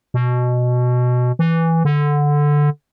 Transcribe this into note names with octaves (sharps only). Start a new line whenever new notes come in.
B2
E3
D3